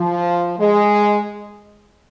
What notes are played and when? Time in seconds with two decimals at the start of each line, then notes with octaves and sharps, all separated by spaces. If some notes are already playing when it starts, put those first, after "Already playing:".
Already playing: F3
0.59 G#3